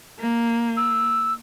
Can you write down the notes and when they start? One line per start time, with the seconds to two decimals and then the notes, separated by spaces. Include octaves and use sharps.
0.20 A#3
0.77 E6